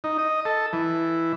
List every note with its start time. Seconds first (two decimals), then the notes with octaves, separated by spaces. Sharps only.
0.04 D#4
0.19 D#5
0.45 A4
0.73 E3